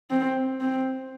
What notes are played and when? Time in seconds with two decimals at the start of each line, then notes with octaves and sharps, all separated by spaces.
0.10 C4
0.61 C4